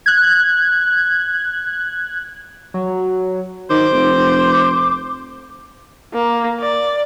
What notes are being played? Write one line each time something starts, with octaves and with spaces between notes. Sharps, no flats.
F#6 G#6
F#3
D#3 C5 D6
F1
A#3
D5